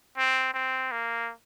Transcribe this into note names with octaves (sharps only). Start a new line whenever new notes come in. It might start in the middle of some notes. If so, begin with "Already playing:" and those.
C4
C4
A#3